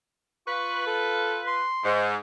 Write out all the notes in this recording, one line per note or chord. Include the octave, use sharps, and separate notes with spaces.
F4 B4 C#6
A4
C6
G#2